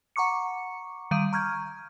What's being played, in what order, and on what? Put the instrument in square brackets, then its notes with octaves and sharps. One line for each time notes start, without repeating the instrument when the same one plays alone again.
[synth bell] F#5 A#5 C#6 D6 C#7
D#3 G3 F5 D7 D#7
A#5 C#6 F6 G6 G#6